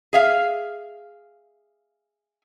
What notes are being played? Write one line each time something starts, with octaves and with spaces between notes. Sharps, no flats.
G#4 E5 F5